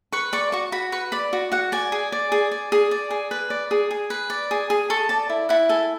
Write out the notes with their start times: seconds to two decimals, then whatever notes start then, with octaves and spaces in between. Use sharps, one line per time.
0.12 B4 C#6
0.33 D5 C#6
0.52 F#4 C#6
0.72 F#4 B5
0.92 B4 C#6
1.12 D5 B5
1.33 F#4
1.52 F#4 F#5
1.72 D5 G#5
1.92 G#4
2.12 D5
2.32 G#4
2.51 D5
2.72 G#4
2.91 D5
3.11 G#4
3.31 B4
3.50 D5
3.71 G#4
3.91 G#4
4.10 B4
4.30 D5
4.51 G#4
4.70 G#4
4.90 A4 C#6
5.09 D5 A5
5.30 E4
5.49 E4 F#5
5.69 A4 G#5